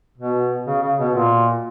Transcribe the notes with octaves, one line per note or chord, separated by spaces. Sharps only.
B2
C#3
C#3
B2
A#2